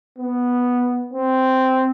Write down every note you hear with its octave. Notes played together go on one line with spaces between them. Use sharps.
B3
C4